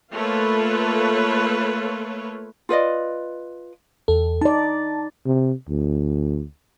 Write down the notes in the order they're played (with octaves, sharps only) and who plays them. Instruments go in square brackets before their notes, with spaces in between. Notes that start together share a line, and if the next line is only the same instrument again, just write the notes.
[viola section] A3 A#3 F4 A4 B4 C#5
[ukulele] F4 B4 D5 D#5
[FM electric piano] E2 A4
[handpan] D#4 D5 [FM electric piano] A5
[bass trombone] C3
D2